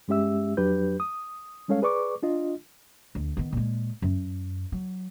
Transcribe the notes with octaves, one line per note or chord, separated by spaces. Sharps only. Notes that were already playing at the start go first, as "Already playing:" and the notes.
G2 G#3 C#4 G4 E5 E6
F2 F#3 D4 G4 B4 G6
D#6
G3 G#3 C#4 A4 C#5 F5
G#4 B4 D5 C#6 D6
D4 F4 D#5
D2
D#3 B3
A#2 G#3
F#2
F#3